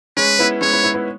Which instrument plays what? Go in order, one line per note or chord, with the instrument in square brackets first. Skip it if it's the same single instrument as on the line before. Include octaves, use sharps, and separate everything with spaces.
[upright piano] G#3 C#4 [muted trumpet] B4
[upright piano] B3 E4
[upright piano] G#3 C#4 [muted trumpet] C#5
[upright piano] B3 E4
B3 E4
B3 E4